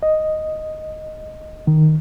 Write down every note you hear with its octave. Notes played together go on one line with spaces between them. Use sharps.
D#5
D#3